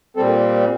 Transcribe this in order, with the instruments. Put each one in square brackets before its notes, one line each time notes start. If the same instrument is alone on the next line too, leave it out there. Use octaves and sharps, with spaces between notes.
[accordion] A#2 G3 C4 A4